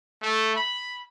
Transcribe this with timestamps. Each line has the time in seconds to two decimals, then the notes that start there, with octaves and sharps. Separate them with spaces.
0.22 A3
0.56 B5